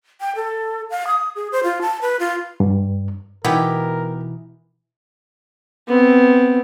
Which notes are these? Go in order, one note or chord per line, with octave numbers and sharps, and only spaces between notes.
G5
A4
F5
D#6
G#4
C5
F4
A5
B4
F4
G2
B2 E3 B3 D#4 G4 A#4
B3 C4